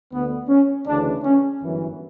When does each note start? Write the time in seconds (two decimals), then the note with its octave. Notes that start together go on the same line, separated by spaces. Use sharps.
0.12 D2 D3 B3
0.49 C#4
0.86 D2 C#3 E3 D4
1.24 C#4
1.61 G1 F#2 E3